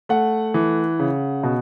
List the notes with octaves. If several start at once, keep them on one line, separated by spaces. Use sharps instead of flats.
A3 F#5
E3
C#3
B2